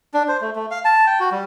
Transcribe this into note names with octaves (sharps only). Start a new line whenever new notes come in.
D4
C5
A3
A3
F5
A5
G5
F#4
G3